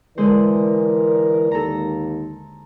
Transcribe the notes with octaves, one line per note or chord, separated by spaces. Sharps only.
D3 E3 G#3 A#4 C5 D5
D#2 A4 A#5